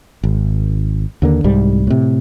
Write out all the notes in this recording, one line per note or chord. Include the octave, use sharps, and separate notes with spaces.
G#1
D#2 D3 A#3
C2 G#2 G3
A2 C3